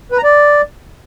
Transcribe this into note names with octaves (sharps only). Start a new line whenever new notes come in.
B4
A#5
D5